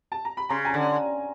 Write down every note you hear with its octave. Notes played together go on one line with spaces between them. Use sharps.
A5
A#5
B5
C#3 A#5 C6
G#5 A#5
D3